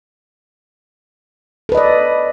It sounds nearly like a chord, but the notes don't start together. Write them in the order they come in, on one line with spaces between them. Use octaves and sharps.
A4 B4 D#5 D5